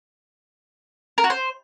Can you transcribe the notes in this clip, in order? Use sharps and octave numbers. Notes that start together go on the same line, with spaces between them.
A#4
F#4
C5